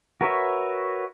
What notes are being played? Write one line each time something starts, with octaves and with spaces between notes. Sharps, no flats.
F#4 A#4 B4 C#5 E5